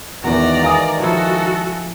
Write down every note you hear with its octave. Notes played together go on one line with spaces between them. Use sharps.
E2 D#3 E3 G#3 F#4 A#4 D5 A#5
F5 G#5 D#6
F3 E4 F#4 A4